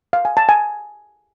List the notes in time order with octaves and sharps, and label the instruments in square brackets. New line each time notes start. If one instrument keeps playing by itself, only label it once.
[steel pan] F5
G#5
A5
G#5